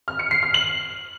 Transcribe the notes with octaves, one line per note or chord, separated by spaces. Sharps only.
F6
C#7
C7
F6
F#7